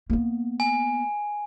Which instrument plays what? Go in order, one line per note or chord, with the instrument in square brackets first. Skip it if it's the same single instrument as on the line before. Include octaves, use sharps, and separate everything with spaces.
[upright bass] A#3 B3
[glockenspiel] G#5